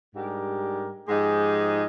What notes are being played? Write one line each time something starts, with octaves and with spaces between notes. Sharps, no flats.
G#2 G3 D4 G4 A#4
G#2 F3 G#3 D#4 G4